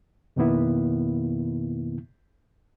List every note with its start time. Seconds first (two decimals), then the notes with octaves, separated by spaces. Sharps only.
0.36 F2 B2 D#3 A#3 B3 E4